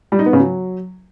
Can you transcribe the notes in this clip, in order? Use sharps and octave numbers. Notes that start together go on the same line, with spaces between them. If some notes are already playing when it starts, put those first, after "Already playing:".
G3
D#4
B3
C#3
F#3